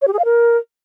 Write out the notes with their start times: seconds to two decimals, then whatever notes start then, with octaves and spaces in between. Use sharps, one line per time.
0.02 C#5
0.08 G4
0.13 G#4
0.19 F5
0.25 A#4